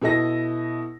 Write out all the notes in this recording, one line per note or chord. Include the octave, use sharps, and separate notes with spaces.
B2 E4 A4 D#5 A#6